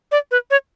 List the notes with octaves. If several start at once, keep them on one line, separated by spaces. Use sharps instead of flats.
D5
B4
C#5